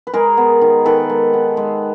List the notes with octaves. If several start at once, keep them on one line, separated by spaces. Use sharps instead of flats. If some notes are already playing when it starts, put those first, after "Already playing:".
B4
G#3 G#4 A#4
B3
D#3
D#3 A4 B4
G#3
B3
G#3